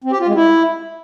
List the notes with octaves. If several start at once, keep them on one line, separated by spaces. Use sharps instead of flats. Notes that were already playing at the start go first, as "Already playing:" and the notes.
C4
G4
F4
G#3
E4